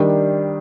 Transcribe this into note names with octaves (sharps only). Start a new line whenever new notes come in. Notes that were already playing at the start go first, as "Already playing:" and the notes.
Already playing: D#3 G3 D4